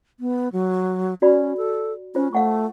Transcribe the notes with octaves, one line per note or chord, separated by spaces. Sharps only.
B3
F#3
C#4 F#4 D5 B5
A4
C#4 F4 C5
A3 F5 F#5 C#6